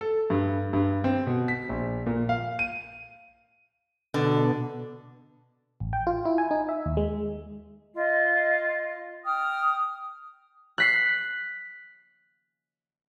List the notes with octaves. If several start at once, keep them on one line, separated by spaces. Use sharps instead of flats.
A4
G2
G2
C4
B2
B6
A#1
A#2
F5
D#7
B2 D3
A1
G5
F4
E4
G#5
D#4
E5
D#2
G#3
F4 D#5
G5 D#6 F6
F#6 B6 C7